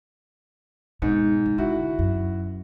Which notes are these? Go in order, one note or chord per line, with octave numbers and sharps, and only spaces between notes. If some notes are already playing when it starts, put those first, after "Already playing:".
G#2 B2
C3
D3 E4 F#4
F#2